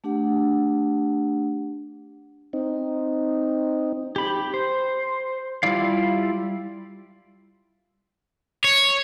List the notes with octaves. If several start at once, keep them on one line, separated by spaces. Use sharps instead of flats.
A3 D4 G4 F#5
C4 D#4
G4 B5
C5
G3 E4 F4 D5 F5
C#5